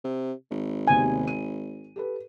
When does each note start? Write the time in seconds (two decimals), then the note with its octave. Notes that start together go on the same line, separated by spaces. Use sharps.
0.05 C3
0.51 G#1
0.87 D#2 C3 B3 G#5
1.28 D#7
1.96 G4 A4 B4